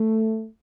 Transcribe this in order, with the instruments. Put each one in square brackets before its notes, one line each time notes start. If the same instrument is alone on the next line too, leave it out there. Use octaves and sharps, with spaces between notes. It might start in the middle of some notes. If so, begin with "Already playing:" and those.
Already playing: [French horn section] A3